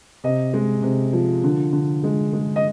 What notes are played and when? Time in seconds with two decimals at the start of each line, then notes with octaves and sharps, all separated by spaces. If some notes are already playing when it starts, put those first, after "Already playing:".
0.24 C3 D#5
0.54 G#3
0.83 C3
1.13 F3
1.44 D3
1.73 D3
2.04 G#3
2.33 G#3
2.56 D#5